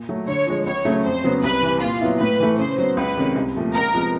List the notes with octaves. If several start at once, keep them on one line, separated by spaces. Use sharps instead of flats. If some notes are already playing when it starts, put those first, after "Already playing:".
Already playing: A#2
F#3 A3
D3 C#5
F3 G#3
C#2 C#5
C#3 F#3 A3
F2 C5
C#3 F#3 B3
C2 B4
C3 E3
A#2 F4
F#3 B3 E4
A2 B4
E3 A3
C#3 C5
F#3 B3
C#2 B4
C3 D#3 G#3 C#4
C2
A#2 F3 A3
C#2 A#4
C3 F3 G#3 B3